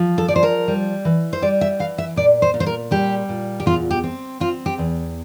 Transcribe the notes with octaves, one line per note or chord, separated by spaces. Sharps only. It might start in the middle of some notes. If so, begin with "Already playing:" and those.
Already playing: F3
A4
F3 D5
C5
A#4
G3
E3
C5
G3 D5
E5
E3 F5
E5
A#2 D5
C5
A#2
C5
A#4
G3 G4
A#2
G4
E2 F4
G4
C4
C4 F4
G4
E2